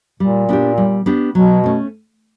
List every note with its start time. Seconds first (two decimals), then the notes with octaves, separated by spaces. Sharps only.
0.20 A#2 G3
0.49 B3 D4 G4
0.78 G3
1.06 B3 D4 G4
1.35 B2 F#3
1.64 A3 C#4